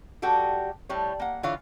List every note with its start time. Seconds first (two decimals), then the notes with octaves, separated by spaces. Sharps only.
0.22 G3 F#4 G4 A4
0.89 A2 G3 C#5
1.20 A#3 F#5
1.43 D3 E3 F4 C#5 F5